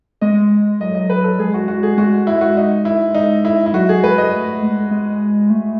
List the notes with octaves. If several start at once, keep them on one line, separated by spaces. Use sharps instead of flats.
G#3 D#5
F#3 D#5
D#5
B4
A4
G#3 G#4
F#4
F#4
G#4
G#3 F#4
G#3 E4
F#4
D#4
E4
D#4
E4
E4
F#3 F#4
G#4
G#3 B4
D#5
A3
G#3
G#3
A3